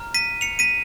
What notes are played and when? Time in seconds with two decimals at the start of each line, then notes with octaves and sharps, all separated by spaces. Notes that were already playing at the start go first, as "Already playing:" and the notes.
Already playing: A#5 F6
0.14 B6 D#7
0.41 C#7 F7
0.59 B6 D#7